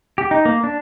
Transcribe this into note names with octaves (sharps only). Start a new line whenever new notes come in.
G4
D#4
A#3
D4